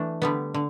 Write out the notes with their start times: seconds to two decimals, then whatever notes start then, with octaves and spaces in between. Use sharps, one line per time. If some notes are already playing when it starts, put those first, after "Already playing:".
Already playing: E3 A3 D4
0.22 D3 G3 B3
0.54 D3